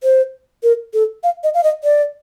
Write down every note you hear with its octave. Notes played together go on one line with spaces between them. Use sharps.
C5
A#4
A4
F5
D#5
F5
D#5
D5